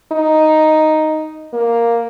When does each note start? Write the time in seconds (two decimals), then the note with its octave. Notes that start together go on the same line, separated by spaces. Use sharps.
0.12 D#4
1.53 A#3